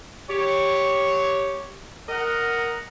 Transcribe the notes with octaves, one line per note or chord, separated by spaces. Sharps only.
G4 C#5
A#4 D#5 F#5 A#5